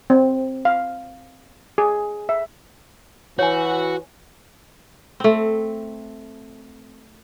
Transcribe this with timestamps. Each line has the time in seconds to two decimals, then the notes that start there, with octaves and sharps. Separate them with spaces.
0.10 C4
0.65 F5
1.78 G#4
2.29 E5
3.39 E3 F#4 C#5 G#5
5.20 A3 C4